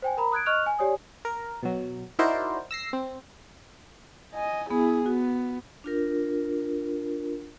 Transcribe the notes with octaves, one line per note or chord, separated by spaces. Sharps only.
C5 G5 G#5
A#4 A#5 B5
D#6 F#6 G#6 D7
D#5 C#6 F6 F#6 F7
G#5
G4 C#5 D5 G#5 D#6
A#4
B2 F#3
D#4 E4 F#4 A#4 C5 D5
E6 A#6 C7
C4
D#5 G#5
B3 E4 G#4
B3 F#4
D4 F4 A#4